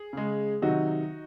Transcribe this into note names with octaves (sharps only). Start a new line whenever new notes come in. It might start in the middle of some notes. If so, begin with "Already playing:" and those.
Already playing: G#4
C#3 G#3
C3 D#3 F#3 D#4 F#4